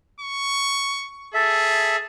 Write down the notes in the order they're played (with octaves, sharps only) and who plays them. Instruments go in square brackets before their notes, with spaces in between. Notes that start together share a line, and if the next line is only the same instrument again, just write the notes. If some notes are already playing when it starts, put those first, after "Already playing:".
[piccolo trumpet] C#6
[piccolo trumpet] G#4 [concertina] A4 E5